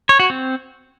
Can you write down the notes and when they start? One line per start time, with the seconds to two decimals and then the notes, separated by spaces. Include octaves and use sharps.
0.09 C#5
0.20 F#4
0.30 C4